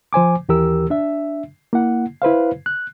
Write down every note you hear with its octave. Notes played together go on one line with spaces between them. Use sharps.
F3 C5 G#5 D6
D#2 E3 G4 A#4 E6
D4 E5
A#3 E4 F#5
E4 B4 C5 F5
F#6